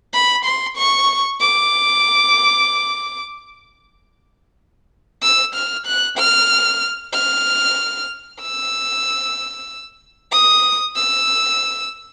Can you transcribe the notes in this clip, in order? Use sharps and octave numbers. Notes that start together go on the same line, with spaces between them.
B5
C6
C#6
D6
E6
F6
F#6
F6
F6
E6
D#6
E6